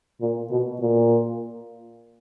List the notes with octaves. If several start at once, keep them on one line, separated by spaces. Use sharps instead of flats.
A#2
B2
A#2